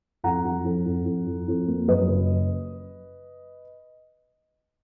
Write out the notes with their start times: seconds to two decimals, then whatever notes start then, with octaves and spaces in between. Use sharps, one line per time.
0.24 F2 F#5 A#5
0.45 F3
0.65 F2
0.86 F2
1.06 F2
1.26 F2
1.48 F2
1.68 A#3
1.88 F#2 B4 D#5
2.09 F#1